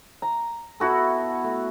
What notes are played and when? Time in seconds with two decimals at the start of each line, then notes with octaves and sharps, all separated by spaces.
0.22 A#5
0.80 B3 E4 F#4 A4
1.44 A3